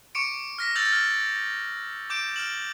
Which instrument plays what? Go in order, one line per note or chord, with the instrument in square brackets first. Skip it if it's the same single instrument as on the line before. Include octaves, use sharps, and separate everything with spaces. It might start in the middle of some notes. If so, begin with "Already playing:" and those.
[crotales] C#6 D6 C#7 D7
F6 A#6 B6
E6 G6 A6 F7 F#7
F6
D6 G6 D7 E7
F6 D7 E7 F#7